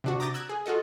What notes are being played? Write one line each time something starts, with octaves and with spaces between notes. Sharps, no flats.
C3 D4 F#4
A#5 D6 D#6 G6 A6 A#6
E6 F#6 G#6
G#4
F4 F#4 A4 D#5